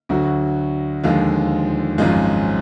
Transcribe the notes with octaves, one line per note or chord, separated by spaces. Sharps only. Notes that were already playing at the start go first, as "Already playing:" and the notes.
D2 D3 F#3 F#4
D#2 D3 F3 G#3 F4
G#1 F#2 F3 G#3 F4